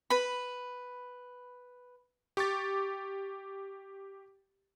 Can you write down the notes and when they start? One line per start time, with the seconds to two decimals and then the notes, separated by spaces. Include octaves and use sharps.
0.10 B4 B5
2.37 G4 C#6 D6 A6